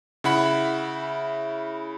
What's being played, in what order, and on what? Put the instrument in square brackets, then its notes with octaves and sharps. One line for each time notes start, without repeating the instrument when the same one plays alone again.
[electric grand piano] C#3 E4 F#5 B5